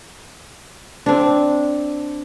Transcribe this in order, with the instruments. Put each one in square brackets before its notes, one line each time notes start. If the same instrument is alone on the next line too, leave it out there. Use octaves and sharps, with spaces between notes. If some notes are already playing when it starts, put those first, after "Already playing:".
[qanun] C4 D4